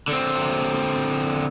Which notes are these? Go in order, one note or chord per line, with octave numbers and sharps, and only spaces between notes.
D3 C4